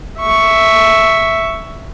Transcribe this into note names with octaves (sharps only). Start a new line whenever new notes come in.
E5 C#6